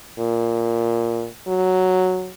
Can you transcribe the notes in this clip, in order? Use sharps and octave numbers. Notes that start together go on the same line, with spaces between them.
A#2
F#3